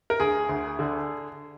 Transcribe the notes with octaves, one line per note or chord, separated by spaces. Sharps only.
A#4
D2 G#4
D2
D3